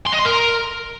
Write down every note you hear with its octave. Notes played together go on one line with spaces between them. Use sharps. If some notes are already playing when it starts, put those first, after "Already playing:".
C6
D#5
C6
A#4